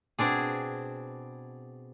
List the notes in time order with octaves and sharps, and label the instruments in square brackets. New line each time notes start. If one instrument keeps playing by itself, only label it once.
[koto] B2 C4 D4 G#4